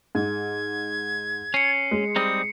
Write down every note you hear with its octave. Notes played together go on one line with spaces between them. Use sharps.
G#2 G#6
C#4 C7 C#7
G#3
G3 C4 D#4 D#6